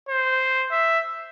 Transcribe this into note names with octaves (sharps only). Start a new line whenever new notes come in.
C5
E5